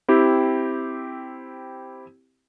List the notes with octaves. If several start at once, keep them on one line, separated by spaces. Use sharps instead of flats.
C4 E4 G4